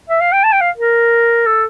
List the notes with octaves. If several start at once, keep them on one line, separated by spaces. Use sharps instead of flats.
E5
F5
G5
A5
G5
F5
A#4
A4